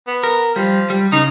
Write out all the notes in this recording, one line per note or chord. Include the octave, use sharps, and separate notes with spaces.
B3
A#4
F3 G3
G3
C#3 D#4